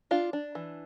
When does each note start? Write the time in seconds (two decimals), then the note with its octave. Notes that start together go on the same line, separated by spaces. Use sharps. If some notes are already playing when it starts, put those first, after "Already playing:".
0.11 D4 F4
0.33 D4
0.55 E3